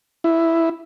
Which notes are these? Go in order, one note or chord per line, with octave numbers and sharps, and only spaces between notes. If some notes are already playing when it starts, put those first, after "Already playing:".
E4